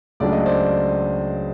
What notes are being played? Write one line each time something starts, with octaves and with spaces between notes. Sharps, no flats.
C#2 C#3 F#3 A3 D4 D5
D#5
C5 D5